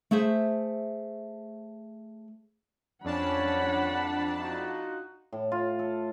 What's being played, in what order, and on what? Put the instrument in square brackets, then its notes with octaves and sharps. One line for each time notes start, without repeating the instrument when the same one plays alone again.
[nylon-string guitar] A3 G#4 C5 E5
[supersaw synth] F2 D4 A5 [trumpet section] C#4 [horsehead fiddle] F#5 B5
[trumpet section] D#4 F4 F#4
[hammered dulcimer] A2
F4
A4